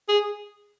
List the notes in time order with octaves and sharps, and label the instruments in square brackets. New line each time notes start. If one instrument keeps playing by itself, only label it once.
[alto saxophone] G#4